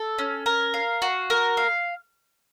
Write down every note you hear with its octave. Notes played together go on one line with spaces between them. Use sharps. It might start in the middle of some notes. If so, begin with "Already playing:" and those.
Already playing: A4
C#4
A#4
F5
F#4
A#4
F5